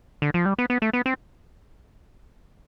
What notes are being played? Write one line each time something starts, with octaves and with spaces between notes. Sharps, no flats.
D3
F3
G3
B3
B3
A3
B3
C4